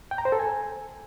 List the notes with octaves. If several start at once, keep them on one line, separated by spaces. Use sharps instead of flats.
G5
A#5
C5
A4
G#5